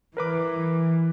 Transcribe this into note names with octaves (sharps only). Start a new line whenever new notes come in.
E3 A#4 B4 D6